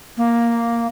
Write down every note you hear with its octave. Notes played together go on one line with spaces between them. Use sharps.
A#3